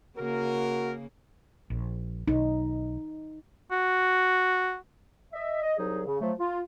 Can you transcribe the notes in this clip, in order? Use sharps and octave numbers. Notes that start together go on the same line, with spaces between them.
C#3 A#3 F#4 A#4
A#1
B1 D#4
F#4
D#5 E5
D#5
C2 F#3 D#4 G#4
C#3
F3 F#3 A3
F4